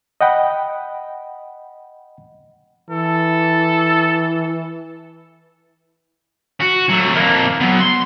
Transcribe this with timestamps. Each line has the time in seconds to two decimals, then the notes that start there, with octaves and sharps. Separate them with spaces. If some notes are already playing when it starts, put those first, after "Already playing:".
0.21 D#5 F#5 G5 B5
2.90 E3 A4
6.60 F#4
6.89 F#3 A3
7.14 F2 A#3
7.60 F#3 B3
7.80 C6